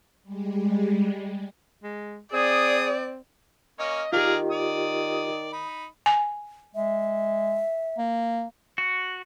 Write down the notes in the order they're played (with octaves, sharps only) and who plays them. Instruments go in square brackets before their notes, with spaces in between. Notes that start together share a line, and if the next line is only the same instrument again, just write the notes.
[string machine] G3 G#3
[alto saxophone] G#3
[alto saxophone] C4 [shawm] G#4 [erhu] D5 [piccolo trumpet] D#6
[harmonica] A#3 C#4 C#5 [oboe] D#5
[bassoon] D#3 [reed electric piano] F4 G4 [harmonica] G#4 D5 A#5 [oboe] F5
[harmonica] D5 [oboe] D#6
[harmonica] D#4 B5
[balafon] G#5
[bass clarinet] G#3 [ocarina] E5
[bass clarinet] A#3
[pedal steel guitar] F#4